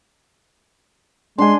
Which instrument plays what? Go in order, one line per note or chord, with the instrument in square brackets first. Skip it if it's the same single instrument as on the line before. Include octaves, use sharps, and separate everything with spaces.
[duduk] G#3 [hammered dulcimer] D4 G#5 [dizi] C6